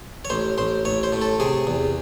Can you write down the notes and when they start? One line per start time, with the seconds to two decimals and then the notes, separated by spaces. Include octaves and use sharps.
0.25 C#5
0.30 A1 C5
0.58 A1 C5
0.85 A1 C#5
1.03 C5
1.13 A2
1.22 A4
1.40 C3 G#4
1.67 E2